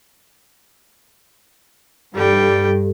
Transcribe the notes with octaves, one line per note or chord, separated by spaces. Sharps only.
G2 G3 G4 A4 G5